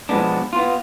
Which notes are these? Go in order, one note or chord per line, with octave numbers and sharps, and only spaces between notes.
B2 F3 G#3 B3 D4
B3 F4